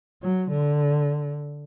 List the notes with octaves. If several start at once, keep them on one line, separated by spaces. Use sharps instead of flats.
F#3
D3